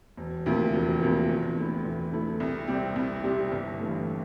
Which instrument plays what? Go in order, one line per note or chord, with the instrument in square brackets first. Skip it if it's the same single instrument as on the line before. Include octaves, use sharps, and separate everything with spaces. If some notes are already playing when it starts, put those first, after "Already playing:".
[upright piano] E1
D2 C3 F3 A#3
E1
D2 C3 F3 A#3
E2
D3 A3 E4
E2
D3 A3 E4
C2
C3 G3 C4 G4
C2
C3 G3 C4 G4
G1
G2 E3 A3